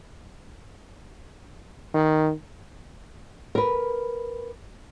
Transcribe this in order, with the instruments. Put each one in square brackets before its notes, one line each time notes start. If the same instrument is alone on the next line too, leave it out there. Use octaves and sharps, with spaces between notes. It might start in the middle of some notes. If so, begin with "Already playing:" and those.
[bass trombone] D#3
[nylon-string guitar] A#4 B4